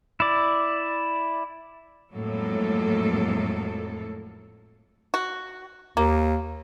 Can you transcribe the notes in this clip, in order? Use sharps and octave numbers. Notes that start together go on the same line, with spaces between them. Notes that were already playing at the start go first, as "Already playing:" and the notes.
E4 D5
F2 A2 F#3 G#3 A#3 A4
F#4
D#2 A#3